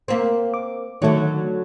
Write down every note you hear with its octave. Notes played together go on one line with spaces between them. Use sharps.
A#3 C4
D6
D3 D#3 F#3 A3